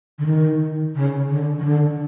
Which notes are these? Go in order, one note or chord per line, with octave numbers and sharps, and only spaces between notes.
D3
D#3
C#3
D3
D#3
D3